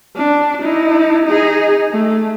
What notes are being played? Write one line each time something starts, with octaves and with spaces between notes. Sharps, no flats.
D4
D#4 E4
D#4 G#4
A3